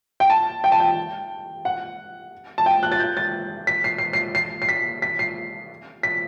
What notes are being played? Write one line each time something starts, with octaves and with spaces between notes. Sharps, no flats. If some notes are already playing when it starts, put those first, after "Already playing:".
G5
A5
G5
A5
G5
F#5
A5
G5
F#6
A6
G6
A6
B6
C7
C7
C7
C7
C7
B6
B6
C7
B6